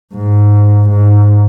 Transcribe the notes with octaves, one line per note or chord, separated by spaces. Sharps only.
G#2
G#2